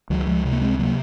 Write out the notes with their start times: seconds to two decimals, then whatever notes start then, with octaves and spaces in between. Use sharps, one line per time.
0.10 C#2 D#3 F#3
0.27 F3 G#3
0.45 C3
0.52 A#3
0.62 G#3 C4
0.79 C3 F#3 A#3